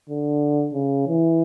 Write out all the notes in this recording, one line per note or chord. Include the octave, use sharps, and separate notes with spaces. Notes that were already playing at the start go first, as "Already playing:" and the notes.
D3
C#3
E3